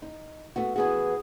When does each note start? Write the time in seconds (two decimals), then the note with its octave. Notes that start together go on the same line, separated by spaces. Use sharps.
0.02 D#4
0.56 A3 B3 F#4
0.76 E3 B3 F#4 G#4